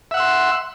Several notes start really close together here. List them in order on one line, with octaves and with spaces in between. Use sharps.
E5 F#5 E6 C6